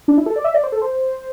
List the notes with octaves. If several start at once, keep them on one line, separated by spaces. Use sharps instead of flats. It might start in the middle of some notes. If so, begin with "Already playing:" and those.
D4
E4
A4
D5
E5
D5
C5
A4
C5